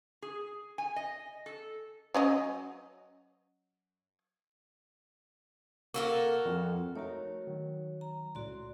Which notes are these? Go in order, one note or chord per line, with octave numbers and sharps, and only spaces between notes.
G#4
G#5
D#5
A4
F#3 C#4 D#5
A#3 F#4 A4 A#4
F2
A3 D#4 F#4 A#4 C#5
D#3 F#3
A#5
C#2 A2 F#4 D5 C6